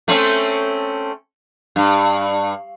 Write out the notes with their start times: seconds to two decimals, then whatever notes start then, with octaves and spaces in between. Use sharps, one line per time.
0.08 A3 C4 C#4
1.76 G2